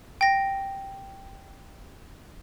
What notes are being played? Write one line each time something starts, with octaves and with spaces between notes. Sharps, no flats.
G5 A#6